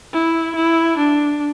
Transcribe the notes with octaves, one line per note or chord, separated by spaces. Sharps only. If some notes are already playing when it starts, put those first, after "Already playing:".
E4
E4
D4